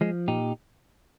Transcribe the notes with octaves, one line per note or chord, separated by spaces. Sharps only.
F3 G#3
A#2 D#4 G4